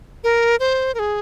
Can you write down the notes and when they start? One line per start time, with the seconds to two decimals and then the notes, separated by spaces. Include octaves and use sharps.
0.24 A#4
0.60 C5
0.95 A#4
0.99 G#4